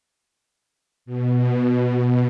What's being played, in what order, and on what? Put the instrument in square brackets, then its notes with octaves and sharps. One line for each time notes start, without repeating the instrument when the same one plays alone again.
[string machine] B2